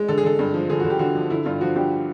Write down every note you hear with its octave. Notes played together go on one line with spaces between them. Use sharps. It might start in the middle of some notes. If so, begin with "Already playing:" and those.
Already playing: G#3
D3 A4
G#4
D3 A4
G2
F3
D3 G#4
F#4
D3
G4
D3 F#4
F3
D3 E4
G2 F4
F3 F#4
G2 G4